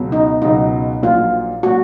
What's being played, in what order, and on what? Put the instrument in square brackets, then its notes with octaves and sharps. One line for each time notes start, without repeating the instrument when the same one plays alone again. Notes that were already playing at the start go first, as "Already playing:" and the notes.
Already playing: [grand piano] C#2 B2 F#3 B3
[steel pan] D#4
[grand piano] C#2 B2 F#3 B3 [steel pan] D#4
[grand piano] A#1 A#2 F#3 [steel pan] F4
[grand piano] A#2 F#3 [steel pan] F#4